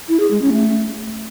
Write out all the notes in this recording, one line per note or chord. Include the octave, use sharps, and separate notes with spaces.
E4
G#4
G#3
C#4
A3